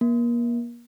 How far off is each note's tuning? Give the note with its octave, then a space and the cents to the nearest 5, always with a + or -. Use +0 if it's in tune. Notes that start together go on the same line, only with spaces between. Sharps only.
A#3 +35